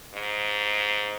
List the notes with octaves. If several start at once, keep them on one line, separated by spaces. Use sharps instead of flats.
G#2